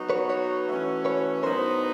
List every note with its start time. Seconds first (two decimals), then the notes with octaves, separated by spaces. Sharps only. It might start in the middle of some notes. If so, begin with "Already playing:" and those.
Already playing: F#3 B3 D#4 F#4
0.10 B4 C#5
0.29 B4 C#5
0.67 E3 A3 C#4 F#4
1.05 B4 C#5
1.43 A2 F#3 B3 D#4 A#4 C5